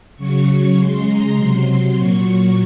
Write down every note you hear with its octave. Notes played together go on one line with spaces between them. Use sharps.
C#3 F#3 C#6
C#3 G#3 C6
A#5
C3 F#3 C6
A#2 F#3 C#6